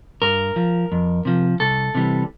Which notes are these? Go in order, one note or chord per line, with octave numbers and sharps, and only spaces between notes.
G2 A#4
F3
F2
C3 F3
C2 A4
C3 E3 G3